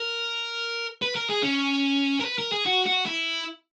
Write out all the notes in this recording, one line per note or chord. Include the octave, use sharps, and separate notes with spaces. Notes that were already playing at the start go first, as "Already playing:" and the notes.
Already playing: A#4
B4
A#4
G#4
C#4
A#4
B4
A#4
G#4
F#4
F#4
E4